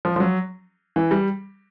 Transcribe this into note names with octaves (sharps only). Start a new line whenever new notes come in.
F3
F3
F#3
E3
G3